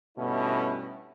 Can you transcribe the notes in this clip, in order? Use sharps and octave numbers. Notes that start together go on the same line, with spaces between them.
G2 B2 A3 C#4 E4